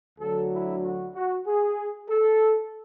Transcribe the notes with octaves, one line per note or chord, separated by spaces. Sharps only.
D2 D3 F#3 A4
E4
F#4
F#4
G#4
A4